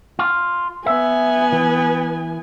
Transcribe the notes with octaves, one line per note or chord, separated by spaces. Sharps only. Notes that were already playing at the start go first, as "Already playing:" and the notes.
F4
B3 E5 G#5
E3